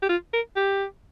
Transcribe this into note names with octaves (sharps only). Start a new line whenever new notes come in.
G4
F4
A#4
G4